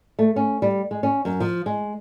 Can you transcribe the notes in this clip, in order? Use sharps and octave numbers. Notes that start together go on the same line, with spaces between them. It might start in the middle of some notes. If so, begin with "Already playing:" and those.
A3
C#4
G3
G#3
C#4
F#2
F3
G#3